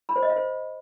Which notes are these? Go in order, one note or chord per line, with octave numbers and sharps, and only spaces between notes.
B5
C5
D#5
F5
C5